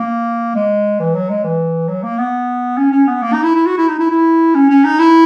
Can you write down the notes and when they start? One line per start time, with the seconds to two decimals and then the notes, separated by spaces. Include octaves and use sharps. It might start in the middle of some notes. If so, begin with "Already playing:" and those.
Already playing: A#3
0.55 G#3
1.00 E3
1.14 F#3
1.29 G#3
1.44 E3
1.88 F#3
2.03 A#3
2.18 B3
2.77 C#4
2.92 C#4
3.07 B3
3.22 A#3
3.33 D#4
3.44 E4
3.55 E4
3.66 F#4
3.77 E4
3.88 D#4
3.99 E4
4.10 E4
4.55 C#4
4.70 C#4
4.84 D#4
4.99 E4